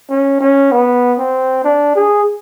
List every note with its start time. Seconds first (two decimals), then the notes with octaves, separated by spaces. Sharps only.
0.10 C#4
0.40 C#4
0.72 B3
1.19 C4
1.64 D4
1.96 G#4